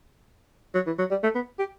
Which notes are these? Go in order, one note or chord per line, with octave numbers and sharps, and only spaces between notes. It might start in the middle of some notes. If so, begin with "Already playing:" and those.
F#3
E3
F#3
G3
A3
B3
G4